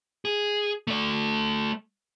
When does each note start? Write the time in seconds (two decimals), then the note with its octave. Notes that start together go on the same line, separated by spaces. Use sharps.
0.25 G#4
0.87 A3 D5